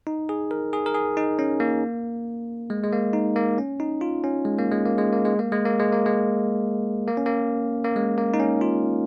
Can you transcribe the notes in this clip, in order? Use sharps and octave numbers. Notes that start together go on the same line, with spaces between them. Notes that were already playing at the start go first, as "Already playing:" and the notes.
D#4
G#4
A#4
G#4
A#4
G#4
D#4
C#4
A#3
G#3
G#3
A#3
D#4
A#3
C#4
D#4
F4
C#4
G#3
A#3
G#3
A#3
G#3
A#3
G#3
A#3
G#3
A#3
G#3
A#3
G#3
A#3
C#4
A#3
A#3
G#3
A#3
D#4
C#4
F4